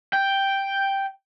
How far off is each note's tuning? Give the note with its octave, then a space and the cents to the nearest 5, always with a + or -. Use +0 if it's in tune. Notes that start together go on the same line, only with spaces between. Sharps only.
G5 +0